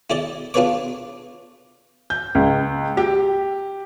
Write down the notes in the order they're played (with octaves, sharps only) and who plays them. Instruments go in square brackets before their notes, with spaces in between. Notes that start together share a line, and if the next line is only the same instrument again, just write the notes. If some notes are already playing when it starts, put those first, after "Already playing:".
[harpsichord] E4 G#4 D5 D#5
D4 F4 G#4 B4 C#5 D6
[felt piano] G6
C#2
G4